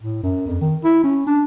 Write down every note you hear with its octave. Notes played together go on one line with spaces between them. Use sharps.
A2
F#2
F2
D#3
E4
C#4
D4